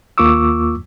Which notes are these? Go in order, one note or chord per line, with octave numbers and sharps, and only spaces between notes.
D#2 A#3 F4 C#6 D6 E6